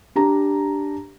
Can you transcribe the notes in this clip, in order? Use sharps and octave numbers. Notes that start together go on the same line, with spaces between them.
D4 G4 A#5